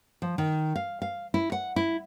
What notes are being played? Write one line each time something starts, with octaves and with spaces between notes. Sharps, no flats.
F3
D#3
F5
F5
E4
F#5
E4